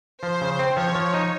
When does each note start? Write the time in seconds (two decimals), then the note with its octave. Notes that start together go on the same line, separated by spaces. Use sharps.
0.23 F3 C5
0.41 C#3
0.59 C4
0.76 F3 C#5
0.95 F3
1.14 D#4